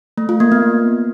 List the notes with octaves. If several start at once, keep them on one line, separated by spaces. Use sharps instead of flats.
A3
F4
A#3
B3